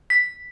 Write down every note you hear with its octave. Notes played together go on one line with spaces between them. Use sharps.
B6